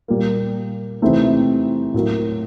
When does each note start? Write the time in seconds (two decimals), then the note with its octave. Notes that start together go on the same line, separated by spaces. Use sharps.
0.08 A#2 G3 A#3
1.02 C3 E3 A3 C4 D#4
1.94 A2 F#3 A#3